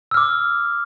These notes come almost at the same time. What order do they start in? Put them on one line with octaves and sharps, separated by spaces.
E6 F6 D6